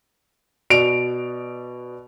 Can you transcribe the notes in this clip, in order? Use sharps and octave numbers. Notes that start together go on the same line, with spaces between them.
B2 D5 D7 F7